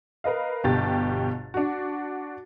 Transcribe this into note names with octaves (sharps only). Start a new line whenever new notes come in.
A#4 B4 D#5 F5
G1 B2 G4 A6
D4 F#4